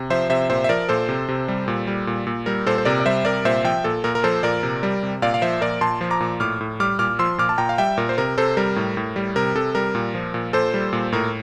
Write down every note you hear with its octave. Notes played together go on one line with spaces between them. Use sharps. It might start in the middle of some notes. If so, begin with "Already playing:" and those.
Already playing: C3
F3 C5 E5
C3 C5 E5
A#2 C5 E5
E5
F3 A#4 D5
A#2 A4 C5
C3
C3
G3
A#2
G3
A#2
A#2
G3 A#4
A#2 A4 C5
C5
C3 A#4 D5
D5
G3 C5 E5
C3 A#4 D5
A#2 C5 E5
F3 E5 G5
A#2 A4
A#2 A#4
A#4
F3 A4 C5
A#2 A#4 D5
C3
G3
C3
A#2 D5 F5
F5
F3 C5 E5
A#2 A#4 D5
A#2 A5 C6
F3
A#5 D6
A#2
A2 D6 F6
A2
G3 D6 F6
A#2 D6 F6
F3 C6 E6
A#2 D6 F6
A5
A#2 G5 A#5
F5
G3 E5 G5
A#2 A#4
C5
C3 A#4
C3 A4 C5
G3 A#4
A2
A2
G3
C3 A#4
C3 A4
G3 A#4
A#2
F3
A#2
A#2 A4 C5
G3
A#2
A2 A#4